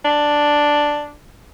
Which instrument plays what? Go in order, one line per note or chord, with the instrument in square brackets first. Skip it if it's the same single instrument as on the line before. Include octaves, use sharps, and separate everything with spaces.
[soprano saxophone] D4